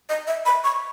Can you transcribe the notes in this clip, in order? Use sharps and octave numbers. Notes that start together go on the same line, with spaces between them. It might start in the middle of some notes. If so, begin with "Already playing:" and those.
D#5
E5
B5
C#6